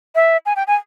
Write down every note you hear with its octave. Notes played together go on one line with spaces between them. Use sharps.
E5
G#5
G5
G#5